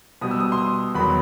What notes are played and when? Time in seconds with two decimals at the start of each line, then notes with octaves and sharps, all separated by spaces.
0.21 B2 G3 D#6
0.31 E6
0.40 D#6
0.52 C6
0.58 D#6
0.95 E2 D#3 F#3 B5